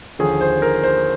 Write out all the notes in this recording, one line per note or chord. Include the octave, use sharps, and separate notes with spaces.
D#2 D3 F3 G#4
C5
A#4
C5